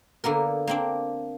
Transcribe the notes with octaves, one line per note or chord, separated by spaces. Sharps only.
D3 A#3 B3 A#4
A#3 C4 D4